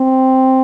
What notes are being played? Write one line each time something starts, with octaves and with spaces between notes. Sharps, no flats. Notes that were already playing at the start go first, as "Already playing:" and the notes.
Already playing: C4